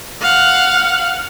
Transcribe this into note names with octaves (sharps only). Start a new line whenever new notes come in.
F5 F#5